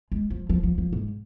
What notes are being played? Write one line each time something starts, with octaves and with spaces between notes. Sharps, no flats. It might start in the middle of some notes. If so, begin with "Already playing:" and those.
G#3
F3
F3
F3
F3
G#2